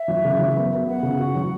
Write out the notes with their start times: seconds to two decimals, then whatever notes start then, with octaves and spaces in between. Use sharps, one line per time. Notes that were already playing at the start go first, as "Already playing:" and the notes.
Already playing: E5
0.08 F#3
0.25 C#3
0.40 F#3
0.56 B3
0.71 B3
0.87 B3 F#5
1.03 C#3
1.19 F#4
1.35 F#3